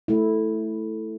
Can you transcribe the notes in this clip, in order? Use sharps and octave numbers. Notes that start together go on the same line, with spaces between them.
A3 E4